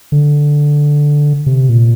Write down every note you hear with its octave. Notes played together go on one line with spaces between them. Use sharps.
D3
C3
A#2